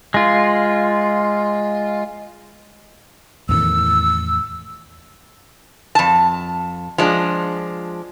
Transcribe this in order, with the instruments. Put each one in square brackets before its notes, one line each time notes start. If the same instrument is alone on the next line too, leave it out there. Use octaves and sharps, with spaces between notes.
[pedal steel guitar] G#3 F4
[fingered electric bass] E2 A2 D#3 [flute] E6
[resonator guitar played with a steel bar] F2 A5
F3 G#3 D4